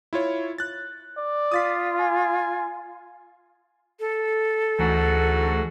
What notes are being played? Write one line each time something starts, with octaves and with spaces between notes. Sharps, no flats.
E4 F4 C#5
F#6 A6
D5
F4 D#6 A6 B6
G#5
A4
D2 G#2 E3 F#4